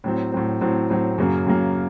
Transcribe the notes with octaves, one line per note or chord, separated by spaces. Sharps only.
A2 F#3 C4
A2 F#3 C4
A2 F#3 C4
A2 F#3 C4
F#2 C#3 F#3 A#3
F#2 C#3 F#3 A#3